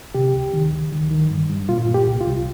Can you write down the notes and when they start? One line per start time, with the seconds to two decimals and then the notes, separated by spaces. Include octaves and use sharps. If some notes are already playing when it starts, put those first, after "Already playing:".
0.14 C3 G4
0.34 C#2
0.53 D#3
0.73 C#2
0.92 D#3
1.11 D#3
1.30 G2
1.49 G2
1.69 A#2 F4
1.88 A#2
1.94 G4
2.07 C2
2.21 F4
2.27 C2